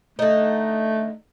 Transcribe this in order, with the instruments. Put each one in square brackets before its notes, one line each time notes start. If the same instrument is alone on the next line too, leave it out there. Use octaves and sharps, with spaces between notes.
[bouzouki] D3 D#4 [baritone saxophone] A3